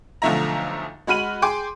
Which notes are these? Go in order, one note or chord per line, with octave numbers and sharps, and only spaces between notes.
B1 D3 F3 A3 E5 A#5
G#3 F#4 B5 F6 D#7 F#7
G#4 G5 C6 D6